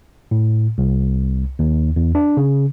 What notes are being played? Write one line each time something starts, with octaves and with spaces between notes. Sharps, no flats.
A2
C2
D#2
E2
D4
C#3